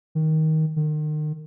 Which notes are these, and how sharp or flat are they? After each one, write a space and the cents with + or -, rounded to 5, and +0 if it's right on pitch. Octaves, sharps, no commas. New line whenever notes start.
D#3 +15
D#3 -35